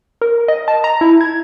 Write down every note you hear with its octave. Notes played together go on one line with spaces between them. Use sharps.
A#4
D#5
A5
A#5
E4
G#6